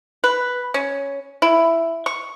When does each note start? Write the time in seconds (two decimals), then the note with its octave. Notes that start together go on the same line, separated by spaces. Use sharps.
0.24 B4
0.74 C#4
1.42 E4
2.06 C#6